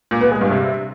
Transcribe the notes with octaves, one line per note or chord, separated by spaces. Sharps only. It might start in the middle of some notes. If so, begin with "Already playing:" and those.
A#2
B3
G#3
G2
C3